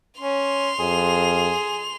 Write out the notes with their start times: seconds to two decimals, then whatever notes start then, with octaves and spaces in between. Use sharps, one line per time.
0.21 C#4 C6 F7
0.79 F2 G#4